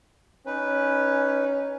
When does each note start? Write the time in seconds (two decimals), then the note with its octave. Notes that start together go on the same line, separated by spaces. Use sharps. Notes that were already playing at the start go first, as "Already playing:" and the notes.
0.46 C#4 D#4 B4